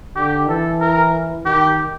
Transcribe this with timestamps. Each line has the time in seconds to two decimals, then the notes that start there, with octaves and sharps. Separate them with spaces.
0.16 D3 G4
0.48 E3 A4
0.80 A#4
1.45 D#3 G4